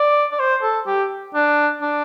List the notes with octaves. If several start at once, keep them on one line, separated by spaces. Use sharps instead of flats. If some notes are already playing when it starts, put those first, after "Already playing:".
Already playing: D5
D5
C5
A4
G4
D4
D4